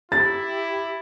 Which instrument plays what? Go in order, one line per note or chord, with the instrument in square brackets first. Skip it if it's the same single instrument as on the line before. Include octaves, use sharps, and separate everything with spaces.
[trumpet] E4 [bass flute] G4 [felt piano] A6